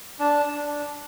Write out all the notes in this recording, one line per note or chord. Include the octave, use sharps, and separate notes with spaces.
D4 A5
D4